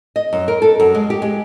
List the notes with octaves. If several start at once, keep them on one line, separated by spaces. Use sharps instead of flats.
D#5
F#2
A#4
A4
F#2
G#3
G4
G#3